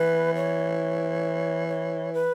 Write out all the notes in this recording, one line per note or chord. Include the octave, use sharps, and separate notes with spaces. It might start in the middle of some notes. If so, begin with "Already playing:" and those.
Already playing: E3 B4
C#5
C#5
B4